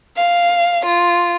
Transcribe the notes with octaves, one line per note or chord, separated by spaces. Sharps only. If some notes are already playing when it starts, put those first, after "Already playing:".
F5
F4